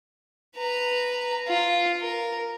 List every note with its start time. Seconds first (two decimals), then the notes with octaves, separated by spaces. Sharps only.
0.57 B4 A#5
1.48 F4
2.01 A#4